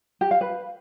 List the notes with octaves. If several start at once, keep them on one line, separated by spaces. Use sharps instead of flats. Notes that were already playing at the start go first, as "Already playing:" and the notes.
G4
F5
B4